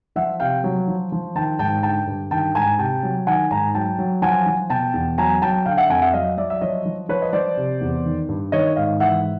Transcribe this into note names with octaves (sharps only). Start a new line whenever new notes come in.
F3 E5 F#5
C3 F5 G5
F#3
F3
F3
D#3 G5 A5
G#2 G5 A5
D3 G5 A5
G2
D#3 G5 A5
G#2 G#5 A#5
C3 G5 A5
F#3
D#3 F#5 G#5
G#2 G#5 A#5
F#3 G5 A5
F#3
F3 F#5 G#5
F3
B2 G5 A5
E2
F#3 G#5 A#5
F#3 G5 A5
D3 F5 G5
E5 F#5
F2 F#5 G#5
E5 F#5
F#3 D#5 F5
F#3 D5 E5
E5
F3 C#5 D#5
F3
F3 B4 C#5
D#5
F3 C5 D5
C3
E2
D#3
G2
D#3 C#5 D#5
G#2 D#5 F5
E3 E5 F#5